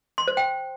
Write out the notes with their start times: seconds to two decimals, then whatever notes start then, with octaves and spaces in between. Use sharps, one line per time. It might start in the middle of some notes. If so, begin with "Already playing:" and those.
0.18 C6
0.28 C5
0.37 G5